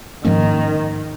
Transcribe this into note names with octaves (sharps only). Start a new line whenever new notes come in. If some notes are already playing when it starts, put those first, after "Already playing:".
G#2 D#3 F3 A#3 C#4